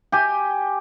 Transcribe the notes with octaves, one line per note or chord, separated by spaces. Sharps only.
G4 G#5